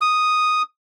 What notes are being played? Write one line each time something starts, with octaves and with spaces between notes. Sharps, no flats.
D#6